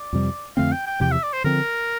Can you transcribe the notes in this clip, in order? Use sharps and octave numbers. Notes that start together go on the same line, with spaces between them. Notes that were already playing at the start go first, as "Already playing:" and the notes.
Already playing: D5
F2 C3 G3
F2 D3 A3 C4 F5
G5
G5
E2 C3 F3 G5
E5
D5
C5
D3 F3 C4 A#4